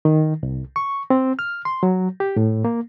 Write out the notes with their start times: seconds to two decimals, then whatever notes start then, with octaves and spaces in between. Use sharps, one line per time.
0.05 D#3
0.43 C2
0.76 C#6
1.10 C4
1.39 F6
1.65 C6
1.83 F#3
2.20 G4
2.36 A2
2.65 A#3